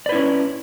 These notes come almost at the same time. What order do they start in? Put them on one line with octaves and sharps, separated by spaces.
D5 B4 E4 C#4